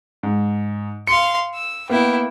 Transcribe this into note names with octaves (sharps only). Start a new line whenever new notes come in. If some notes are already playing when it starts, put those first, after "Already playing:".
G#2
F5 C6 C#7
E6
A#3 B3 E4 G5